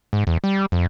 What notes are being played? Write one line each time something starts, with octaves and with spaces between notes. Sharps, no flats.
G#2
E2
G3
F2